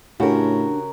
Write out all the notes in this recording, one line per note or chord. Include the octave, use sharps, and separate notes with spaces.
A2 C#3 D4 F#4 G4 A#4